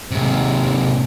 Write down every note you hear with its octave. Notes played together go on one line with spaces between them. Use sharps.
G#2 C3